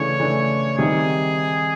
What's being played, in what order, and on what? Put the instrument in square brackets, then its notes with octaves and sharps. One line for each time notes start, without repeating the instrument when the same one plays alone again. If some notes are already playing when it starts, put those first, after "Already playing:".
Already playing: [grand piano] C#3 E3 A3 D4 [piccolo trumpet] C#5
[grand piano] C#3 E3 A3 D4
[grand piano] C3 D#3 G3 [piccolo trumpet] G#4